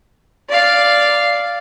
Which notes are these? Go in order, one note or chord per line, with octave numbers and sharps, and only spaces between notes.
D5 F5